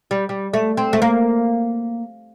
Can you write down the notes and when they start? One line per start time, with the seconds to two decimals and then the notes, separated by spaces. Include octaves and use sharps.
0.11 G3
0.29 G3
0.54 A3
0.77 C4
0.93 A3
1.02 A#3